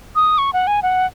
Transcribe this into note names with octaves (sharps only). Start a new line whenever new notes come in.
D#6
C#6
F#5
G#5
F#5